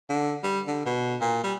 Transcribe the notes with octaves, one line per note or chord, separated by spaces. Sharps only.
D3
G3
D3
B2
A#2
G3